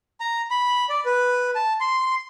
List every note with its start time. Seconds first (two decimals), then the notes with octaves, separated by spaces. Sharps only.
0.20 A#5
0.51 B5
0.89 D5
1.05 B4
1.55 A5
1.81 C6